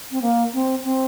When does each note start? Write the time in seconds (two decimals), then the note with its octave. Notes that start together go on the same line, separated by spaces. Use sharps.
0.11 C4
0.22 A#3
0.54 C4
0.84 C4